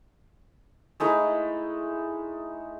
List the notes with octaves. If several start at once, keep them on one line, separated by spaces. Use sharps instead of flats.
G#3 A3 D#4 E4